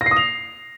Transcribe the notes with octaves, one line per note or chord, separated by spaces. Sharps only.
A#6
C7
D#6
F7